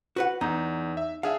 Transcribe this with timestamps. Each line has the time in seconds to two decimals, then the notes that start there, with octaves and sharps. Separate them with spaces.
0.16 F#4 B4 F#5
0.41 E2 D#4
0.97 E5
1.23 D4 G#4 E5 F5